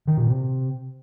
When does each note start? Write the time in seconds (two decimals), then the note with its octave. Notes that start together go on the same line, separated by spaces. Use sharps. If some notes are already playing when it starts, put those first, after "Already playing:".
0.07 D#3
0.17 A#2
0.27 C3